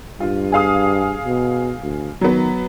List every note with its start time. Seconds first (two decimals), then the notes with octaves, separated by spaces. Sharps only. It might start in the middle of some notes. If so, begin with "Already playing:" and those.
0.20 G2 F4
0.52 G#4 F5 D#6
1.25 B2
1.83 D2
2.21 D#3 F#3 B3